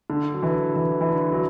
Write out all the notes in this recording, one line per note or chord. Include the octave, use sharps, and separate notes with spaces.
D3
F#3
E3
E3
E3
D3
F#3